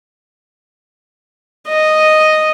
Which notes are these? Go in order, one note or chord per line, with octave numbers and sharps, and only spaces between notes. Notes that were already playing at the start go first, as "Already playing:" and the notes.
D#5